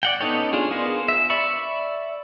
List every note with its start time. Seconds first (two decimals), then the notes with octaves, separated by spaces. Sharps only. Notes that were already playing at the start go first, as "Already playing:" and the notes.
0.03 D5 F#5 G5
0.21 B3 C#4 D#4 A4 C#5
0.53 D4 F4 G#4
0.71 B3 F4 G#4 A#4 C5
1.08 E5
1.30 D5 E5 B5 C#6